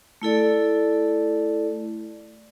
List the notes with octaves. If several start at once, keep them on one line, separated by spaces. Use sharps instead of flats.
A3 E4 A4 D5